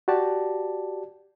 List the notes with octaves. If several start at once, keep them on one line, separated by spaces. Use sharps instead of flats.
F#4 G4 D5 A5